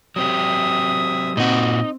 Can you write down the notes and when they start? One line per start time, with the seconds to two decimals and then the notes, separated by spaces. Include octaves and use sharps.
0.16 F#3 C4 G4 E5 D#6
1.37 A#2 C4 D#4 F#4